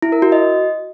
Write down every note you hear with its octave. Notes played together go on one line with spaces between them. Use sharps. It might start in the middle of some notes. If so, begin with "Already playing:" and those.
E4
A#4
F#4
D#5